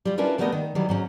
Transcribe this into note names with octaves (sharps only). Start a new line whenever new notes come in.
G3 F4
C#4 D4 E4 F4 A#4 B4
E3 G3 A3 B3 A#4 D#5
D#3
D#3 E3 F#3 G3
G#2 F#3 C#4